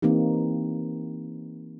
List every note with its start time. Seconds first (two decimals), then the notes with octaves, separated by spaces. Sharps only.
0.02 E3 A#3 C4 D#4 G4